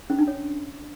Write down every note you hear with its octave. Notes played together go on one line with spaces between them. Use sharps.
C#4
D4
C#5